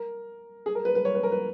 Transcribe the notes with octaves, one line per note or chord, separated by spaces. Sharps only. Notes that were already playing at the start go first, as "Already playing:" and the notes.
Already playing: A#4
G#4
A#4
B4
B4
C#5
B4
A#4
B4